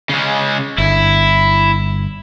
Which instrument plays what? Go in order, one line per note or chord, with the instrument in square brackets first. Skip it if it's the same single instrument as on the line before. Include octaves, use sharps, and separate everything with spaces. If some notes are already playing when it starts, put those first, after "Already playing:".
[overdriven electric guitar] C#3 G#3
[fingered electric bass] G1 [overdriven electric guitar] E4